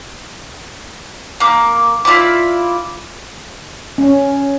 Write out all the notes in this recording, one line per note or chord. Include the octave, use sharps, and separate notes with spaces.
A#3 D6
E4 F4 D5 D6
C#4